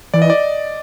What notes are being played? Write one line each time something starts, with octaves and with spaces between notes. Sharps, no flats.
E3 D5
D#5
D5